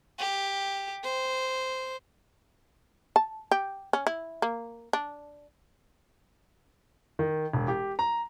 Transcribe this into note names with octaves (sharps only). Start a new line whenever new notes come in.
G4
C5
A5
G4
C#4
E4
A#3
D4
D#3
E1
G4
A#5